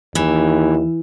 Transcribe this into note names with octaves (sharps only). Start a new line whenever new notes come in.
D#2 E3